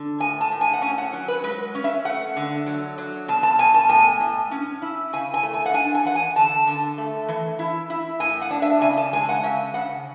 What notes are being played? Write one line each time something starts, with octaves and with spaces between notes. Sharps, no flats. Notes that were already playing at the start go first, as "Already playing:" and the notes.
Already playing: D3
A2 G#5
A5
A2
G#5
F#5
C#4 G#5
F#5
F#3
B4
G#3 B4
C#4
E5
A3 F#5
D3
F#3
F#3
B2 A5
A5
B2 G#5
A5
A2 G#5
A2
C#4
E4
C#3 G#5
G#5
A3
G#5
F#5
D4 G#5
G#5
E3 F#5
G#5
D3 A5
D3
A3
E3
E4
E4
A2 G#5
F#5
D4
E5
C#3 G#5
A5
G#3 G#5
F#5
C#3 E5
C#3 F#5